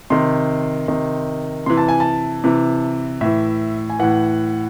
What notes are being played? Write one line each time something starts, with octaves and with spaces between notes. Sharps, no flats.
C3 D#3 C6
C3 D#3
C3 E3 C6
A5
G#5
A5
C3 E3
A2 E3 E5
G#5
A2 E3 F#5